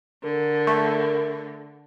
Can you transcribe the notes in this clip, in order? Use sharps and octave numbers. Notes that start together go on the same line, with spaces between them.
D3 A#4
A3